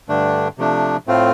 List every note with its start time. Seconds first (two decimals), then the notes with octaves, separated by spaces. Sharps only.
0.09 G2 D3 A3 D4
0.58 C3 F3 A3 D4
1.07 A2 A3 C4 F4